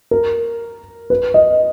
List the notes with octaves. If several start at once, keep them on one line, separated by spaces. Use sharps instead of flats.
A#4
B4
D#5